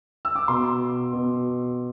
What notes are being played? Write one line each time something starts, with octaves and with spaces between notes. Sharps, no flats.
E6
D6
B2 C6
B2